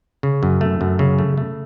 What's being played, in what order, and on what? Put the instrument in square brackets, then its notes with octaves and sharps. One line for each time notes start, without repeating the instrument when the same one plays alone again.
[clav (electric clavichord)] C#3
F#2
A3
F#2
C#3
A3
A3